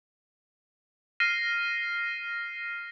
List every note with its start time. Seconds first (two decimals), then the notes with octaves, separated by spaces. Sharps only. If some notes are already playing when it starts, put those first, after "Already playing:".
1.20 F6 A#6 C7 D#7